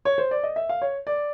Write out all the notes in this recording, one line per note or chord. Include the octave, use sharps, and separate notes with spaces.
C#5
C5
D5
D#5
E5
F5
C#5
D5